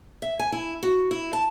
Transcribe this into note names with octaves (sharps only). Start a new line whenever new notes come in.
E5
G#5
E4
F#4
E4
A5